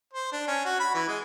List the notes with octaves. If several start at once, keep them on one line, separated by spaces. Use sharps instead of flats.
C5
D4
C#4
F#4
B5
E3
G#3